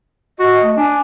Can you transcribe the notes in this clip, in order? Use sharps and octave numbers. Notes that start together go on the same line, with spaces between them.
F#4 D#5
A3
D4 G#5